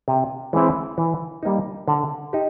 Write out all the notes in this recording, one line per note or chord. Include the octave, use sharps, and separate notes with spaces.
C3
E3 G#3 C4 E4
E3
G3 A#3 D#4
D3
D#4 G4